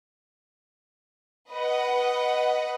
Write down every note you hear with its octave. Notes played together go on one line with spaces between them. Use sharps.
B4 D#5 F#5